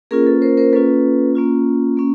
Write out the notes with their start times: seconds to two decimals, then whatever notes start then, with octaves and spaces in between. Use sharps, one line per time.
0.11 A#3 C#4 F4 G#4 A#4
0.26 A4 B4
0.42 A#4 C5
0.57 A#4 C5
0.73 A#3 C#4 F4 A4 B4
1.35 A#3 C#4 F4
1.97 A#3 C#4